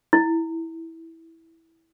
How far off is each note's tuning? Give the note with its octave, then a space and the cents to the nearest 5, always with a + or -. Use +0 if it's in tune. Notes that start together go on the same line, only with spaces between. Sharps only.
E4 -10